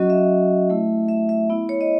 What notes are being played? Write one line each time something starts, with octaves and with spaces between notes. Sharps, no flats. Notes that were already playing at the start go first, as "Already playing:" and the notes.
Already playing: F#3 C#4 F#4 D#5
E5
A3 E4
E5
E5
B3 E4
C#5
D#5